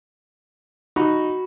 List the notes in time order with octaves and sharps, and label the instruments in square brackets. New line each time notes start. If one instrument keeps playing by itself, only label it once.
[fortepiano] D#4 [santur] F#4 B5 E6